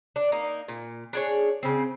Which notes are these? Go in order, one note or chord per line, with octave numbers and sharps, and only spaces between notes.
D4
A#3 D#4
A#2
D4 G#4 C#5
C#3 C4